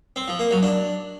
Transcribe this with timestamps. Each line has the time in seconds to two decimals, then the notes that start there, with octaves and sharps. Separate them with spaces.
0.16 C4
0.28 F3
0.39 A#3
0.51 F#3
0.63 D4